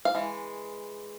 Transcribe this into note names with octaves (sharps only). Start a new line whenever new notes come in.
F5
E3 G#3